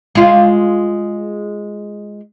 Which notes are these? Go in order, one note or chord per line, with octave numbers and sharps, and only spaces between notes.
G#3 F4